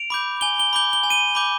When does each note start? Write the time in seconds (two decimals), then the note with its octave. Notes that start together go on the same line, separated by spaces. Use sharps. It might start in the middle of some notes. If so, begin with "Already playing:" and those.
Already playing: D7 F7
0.10 B5 D6 G6
0.41 G#5 G7
0.59 G7
0.73 B5 D6 G6 G7
0.93 G7
1.03 G#5
1.10 D#7 G7
1.35 B5 D6 G6